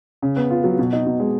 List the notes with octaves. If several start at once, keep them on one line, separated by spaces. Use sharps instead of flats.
C#3
B3
F4
F#3
B2
D#4
B2
G#3